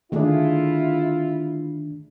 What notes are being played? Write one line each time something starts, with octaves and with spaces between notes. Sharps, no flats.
D3 D#3 A3 D4 E4 F4 G#4